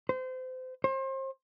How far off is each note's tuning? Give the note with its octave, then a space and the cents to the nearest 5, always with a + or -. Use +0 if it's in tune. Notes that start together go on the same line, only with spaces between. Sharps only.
C5 -30
C5 +35